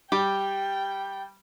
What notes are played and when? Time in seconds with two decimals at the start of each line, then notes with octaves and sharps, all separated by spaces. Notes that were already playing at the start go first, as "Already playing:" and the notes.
0.12 G3 G4 G5